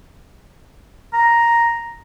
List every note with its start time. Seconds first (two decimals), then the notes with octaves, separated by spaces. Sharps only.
1.14 A#5